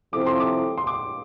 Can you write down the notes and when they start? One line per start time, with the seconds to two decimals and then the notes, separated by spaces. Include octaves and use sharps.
0.13 C3 F3 C4 E4 A4 D6
0.27 C6
0.40 D6
0.78 C6
0.87 D6